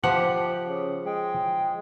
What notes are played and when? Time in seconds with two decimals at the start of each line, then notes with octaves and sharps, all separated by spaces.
0.04 F3 G4 F#5
0.68 C#3
1.06 G#3 G5